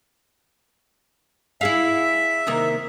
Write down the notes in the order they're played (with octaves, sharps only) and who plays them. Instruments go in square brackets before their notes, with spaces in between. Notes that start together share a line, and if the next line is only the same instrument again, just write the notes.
[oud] E4 G#4 F5 [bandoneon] E5
[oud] C3 D#3 A#3